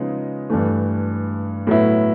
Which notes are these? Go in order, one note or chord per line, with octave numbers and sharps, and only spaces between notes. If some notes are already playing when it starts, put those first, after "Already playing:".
Already playing: C#3 F3 G#3 B3 D#4
G2 E3 A3
A2 F#3 B3 E4